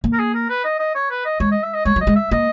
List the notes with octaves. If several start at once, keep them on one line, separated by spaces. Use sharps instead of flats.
A#3
A#4
G#4
A#4
B4
D#5
D#5
C#5
B4
D#5
G#3 C#5
D#5
E5
D#5
G#3 C#5
F#3 D#5
G#3
E5
A#3 D#5